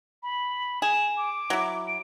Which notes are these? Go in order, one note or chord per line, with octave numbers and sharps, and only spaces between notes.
B5
G#4 E7
D6
F#3 E4
D7